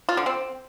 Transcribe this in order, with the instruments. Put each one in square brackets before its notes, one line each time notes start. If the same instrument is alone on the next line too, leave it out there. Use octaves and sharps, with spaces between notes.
[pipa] F4
D3
C4